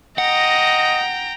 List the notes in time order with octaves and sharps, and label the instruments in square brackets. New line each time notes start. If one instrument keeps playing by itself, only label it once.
[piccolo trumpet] D#5 [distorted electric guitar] F#5 [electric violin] G5 A#5